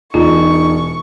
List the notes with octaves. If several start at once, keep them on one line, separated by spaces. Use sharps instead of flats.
E1 D#4 F4 C#6